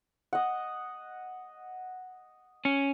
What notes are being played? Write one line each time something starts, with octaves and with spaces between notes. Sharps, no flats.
D#5 F#5
C#4